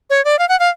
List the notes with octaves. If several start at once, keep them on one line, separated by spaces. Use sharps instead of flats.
C#5
D5
F5
F#5
F5